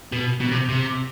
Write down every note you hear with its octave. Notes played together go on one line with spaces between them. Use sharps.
B2
B2
C3
C3